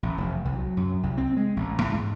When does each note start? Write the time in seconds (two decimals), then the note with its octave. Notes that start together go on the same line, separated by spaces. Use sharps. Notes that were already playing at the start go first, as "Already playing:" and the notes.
0.03 A1
0.18 F1
0.45 C2
0.56 F#3
0.77 F#2
1.03 C2
1.17 C4
1.37 G#3
1.57 A1
1.82 A2
1.94 G#2